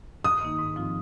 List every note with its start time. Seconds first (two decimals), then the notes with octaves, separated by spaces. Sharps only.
0.24 G2 D#6
0.41 D#3 A#3 D#4
0.59 G#2
0.76 F3 C4 F4